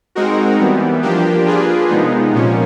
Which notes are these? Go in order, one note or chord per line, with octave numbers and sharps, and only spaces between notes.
G#3 C4 D#4 F#4 A#4
E3 G3 B3
F3 A#3 D4 G4
A#3 D4 F4 G#4 B4
C3 F3 G#3 B3 D#4
A#2 F3 A#3 C#4